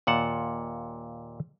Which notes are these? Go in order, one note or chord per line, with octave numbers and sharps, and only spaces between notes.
D#2 A#2 F#5 A5